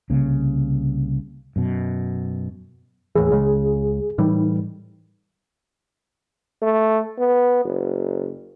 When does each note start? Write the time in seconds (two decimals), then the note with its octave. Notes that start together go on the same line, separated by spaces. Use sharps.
0.10 C2 C#3 A#3
1.56 F#2 B2
3.16 D#2 A2 E3 G#4
3.31 C#2 C#3 G#3
4.18 A2 E3 G3 D#4
6.62 A3
7.18 B3
7.64 F#1